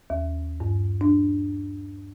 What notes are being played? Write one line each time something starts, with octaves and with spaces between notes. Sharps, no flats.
D#2
G2
D4